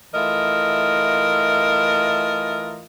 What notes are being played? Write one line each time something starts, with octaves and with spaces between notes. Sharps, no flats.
E3 A3 F4 A#4 D#5 E5